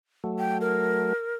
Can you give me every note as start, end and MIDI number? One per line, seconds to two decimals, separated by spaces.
0.24 1.13 54
0.24 1.13 57
0.39 0.58 79
0.61 1.37 70